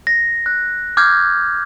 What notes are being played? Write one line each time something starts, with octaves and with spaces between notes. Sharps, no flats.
A#6
F#6
D6 F6 G6 G#6